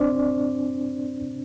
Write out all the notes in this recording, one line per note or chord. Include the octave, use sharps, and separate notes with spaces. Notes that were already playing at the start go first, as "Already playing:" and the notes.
Already playing: C4 D4 C5 D5